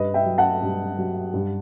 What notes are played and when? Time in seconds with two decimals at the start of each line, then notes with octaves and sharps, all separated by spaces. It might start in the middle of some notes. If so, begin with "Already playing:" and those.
Already playing: G2 B4 D#5
0.14 E5 G5
0.26 F#3
0.38 F#5 A5
0.62 G2
0.98 F#3
1.33 G2